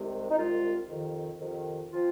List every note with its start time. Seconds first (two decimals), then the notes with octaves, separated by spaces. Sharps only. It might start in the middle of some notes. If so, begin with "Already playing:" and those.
Already playing: C2 C3 D#3 G#3
0.31 D#4
0.37 C2 C3 D#3 G#3 F4
0.89 F2 C3 D#3
1.40 F2 C3 D#3
1.92 F3 C4 F4